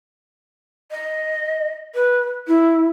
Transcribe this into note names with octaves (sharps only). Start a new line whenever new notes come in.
D#5
B4
E4